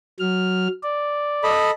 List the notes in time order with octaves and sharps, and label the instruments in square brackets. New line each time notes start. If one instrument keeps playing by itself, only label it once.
[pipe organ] F#3 F6
D5
[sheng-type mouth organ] A4 D#5 B5